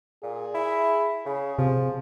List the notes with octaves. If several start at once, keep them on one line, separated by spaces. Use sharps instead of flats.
A#2 G#4
E4
C#3 G#4
C3 F3